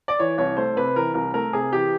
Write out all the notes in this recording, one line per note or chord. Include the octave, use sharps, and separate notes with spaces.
D5
E3 C#5
C2 C#5
A3 C5
C3 B4
E3 A#4
C2 A#4
A3 A#4
C3 G#4
E3 G4